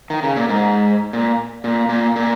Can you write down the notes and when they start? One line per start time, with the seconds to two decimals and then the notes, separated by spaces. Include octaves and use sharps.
0.10 D#3
0.23 C#3
0.36 A#2
0.49 G#2
1.13 A#2
1.64 A#2
1.89 A#2
2.16 A#2